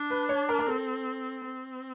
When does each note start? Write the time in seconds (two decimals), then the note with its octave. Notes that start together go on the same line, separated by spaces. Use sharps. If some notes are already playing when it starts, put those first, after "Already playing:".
Already playing: D4
0.10 B4
0.29 C#5
0.49 A#4
0.59 A#4
0.68 C4 A4
1.45 C4